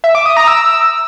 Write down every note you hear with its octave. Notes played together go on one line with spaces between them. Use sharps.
E5
D6
D#6
A#5
E6